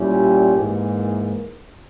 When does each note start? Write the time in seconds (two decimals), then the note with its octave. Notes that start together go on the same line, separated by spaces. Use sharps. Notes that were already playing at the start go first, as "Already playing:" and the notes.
Already playing: A#2 G3 C#4 E4 G4
0.56 G#2 E3 A#3